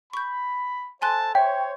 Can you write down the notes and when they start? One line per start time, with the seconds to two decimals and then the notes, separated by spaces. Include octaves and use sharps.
0.13 B5 C#6 G6
1.02 A4 C5 G#5 A5 C6 F#6
1.35 C5 C#5 E5 G5